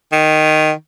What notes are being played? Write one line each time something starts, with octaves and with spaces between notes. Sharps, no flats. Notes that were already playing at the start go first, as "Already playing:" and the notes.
D#3